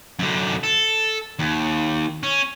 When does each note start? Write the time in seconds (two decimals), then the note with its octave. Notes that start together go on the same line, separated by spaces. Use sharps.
0.19 F#2 D3
0.63 A4
1.39 D#2
2.23 C#4